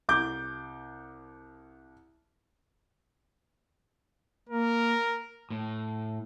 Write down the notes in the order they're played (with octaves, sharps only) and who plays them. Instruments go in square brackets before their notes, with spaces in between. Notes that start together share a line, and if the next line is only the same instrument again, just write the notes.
[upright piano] C2 D6 G6
[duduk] A#3 [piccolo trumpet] A#4
[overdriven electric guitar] A2